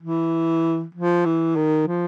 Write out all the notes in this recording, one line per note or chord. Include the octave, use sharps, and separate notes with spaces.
E3
F3
E3
D#3
F3